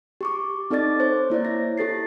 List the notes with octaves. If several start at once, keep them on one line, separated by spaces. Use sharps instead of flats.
G4 C#6 D6
C4 D#4 A4 D5 D6 A6
C5 C#5
A#3 E4 C#5 D5
A#6
E4 G4 A4 A6 C7